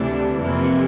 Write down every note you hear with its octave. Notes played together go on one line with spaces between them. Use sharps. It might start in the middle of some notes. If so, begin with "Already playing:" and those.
Already playing: D2 C3 E3 G3 D4
F2 C3 E3 A#3